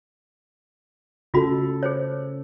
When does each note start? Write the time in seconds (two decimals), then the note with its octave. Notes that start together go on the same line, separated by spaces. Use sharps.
1.34 C#3 C#4 F4 F#4 A4 B5
1.83 G#4 C5 C#5